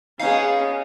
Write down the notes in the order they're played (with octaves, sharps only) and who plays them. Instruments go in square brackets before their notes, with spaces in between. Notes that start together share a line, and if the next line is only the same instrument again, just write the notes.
[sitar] B3 D#4 [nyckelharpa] C#4 G#4 [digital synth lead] F5